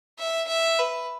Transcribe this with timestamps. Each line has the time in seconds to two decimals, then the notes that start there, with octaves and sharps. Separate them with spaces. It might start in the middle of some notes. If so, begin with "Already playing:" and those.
0.18 E5
0.48 E5
0.78 B4